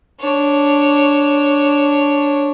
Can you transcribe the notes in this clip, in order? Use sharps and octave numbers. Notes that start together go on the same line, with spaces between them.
D4 C#5